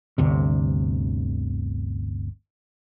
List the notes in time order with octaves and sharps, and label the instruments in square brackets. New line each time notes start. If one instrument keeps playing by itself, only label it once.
[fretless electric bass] G1 D2 C3